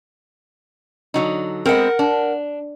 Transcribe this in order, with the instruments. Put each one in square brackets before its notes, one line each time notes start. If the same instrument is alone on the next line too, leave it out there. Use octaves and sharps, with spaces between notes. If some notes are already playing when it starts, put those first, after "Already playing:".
[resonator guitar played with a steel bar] D3 F#3 D#4
[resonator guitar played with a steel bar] G#3 B3 C4 [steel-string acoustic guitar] A#4 F#5
[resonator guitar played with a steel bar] D4